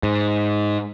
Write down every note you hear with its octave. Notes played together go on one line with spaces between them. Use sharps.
G#2